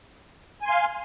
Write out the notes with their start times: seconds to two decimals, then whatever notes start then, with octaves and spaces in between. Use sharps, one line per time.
0.61 G#5
0.66 C6
0.70 F5